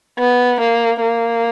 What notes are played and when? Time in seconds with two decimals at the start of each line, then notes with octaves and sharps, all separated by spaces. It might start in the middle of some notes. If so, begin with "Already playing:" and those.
0.19 B3
0.60 A#3
1.01 A#3